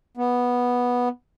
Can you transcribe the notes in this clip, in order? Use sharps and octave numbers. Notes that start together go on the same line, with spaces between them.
B3